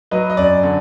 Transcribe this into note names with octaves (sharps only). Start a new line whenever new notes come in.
F#3 B4 D#5
D#5
F#2 D5
D3